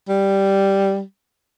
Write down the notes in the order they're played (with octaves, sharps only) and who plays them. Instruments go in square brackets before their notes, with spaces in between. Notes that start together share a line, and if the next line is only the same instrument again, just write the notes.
[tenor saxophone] G3